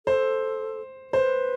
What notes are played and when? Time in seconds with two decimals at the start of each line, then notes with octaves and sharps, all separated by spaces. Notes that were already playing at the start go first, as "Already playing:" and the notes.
0.06 A4 C5
1.13 B4 C5